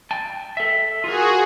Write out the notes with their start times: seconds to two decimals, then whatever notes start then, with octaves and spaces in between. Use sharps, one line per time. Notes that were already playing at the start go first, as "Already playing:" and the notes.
0.11 G5 A5
0.57 A4 E5
1.04 F4 F#4 G#4 A#4